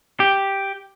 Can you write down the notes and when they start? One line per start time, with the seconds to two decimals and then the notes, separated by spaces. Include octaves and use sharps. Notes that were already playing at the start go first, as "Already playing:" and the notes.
0.20 G4